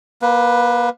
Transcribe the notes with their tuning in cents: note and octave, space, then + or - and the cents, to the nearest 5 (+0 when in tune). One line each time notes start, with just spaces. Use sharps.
A#3 +30 B4 +0